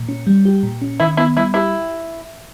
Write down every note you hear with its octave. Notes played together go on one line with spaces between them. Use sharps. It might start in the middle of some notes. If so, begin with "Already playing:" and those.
Already playing: A#2
C#4
G3
G4
A#2
C#4
D#3 E4
B3 E4
G3 E4
E4 G4